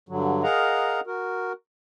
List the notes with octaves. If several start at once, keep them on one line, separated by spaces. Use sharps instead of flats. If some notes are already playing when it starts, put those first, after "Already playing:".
G2 D3 F#3
G#4 A#4 D#5 F5 F#5 A#5
F#4 A#4